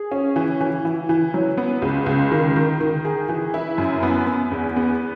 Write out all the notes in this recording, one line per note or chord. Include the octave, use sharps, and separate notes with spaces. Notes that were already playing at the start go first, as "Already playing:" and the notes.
Already playing: G#4
C#4
E3
E3
E3
E3
F#3
B3
C#2
C#2
D#3
D#3
D#3
G#4
E3
E4
F#2
B3
B3
E2
B3